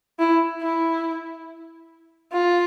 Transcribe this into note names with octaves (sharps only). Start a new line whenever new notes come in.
E4
E4
F4